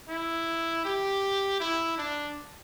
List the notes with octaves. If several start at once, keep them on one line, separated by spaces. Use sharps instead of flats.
E4
G4
E4
D4